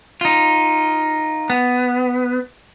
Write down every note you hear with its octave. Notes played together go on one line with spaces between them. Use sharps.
D#4 F4
B3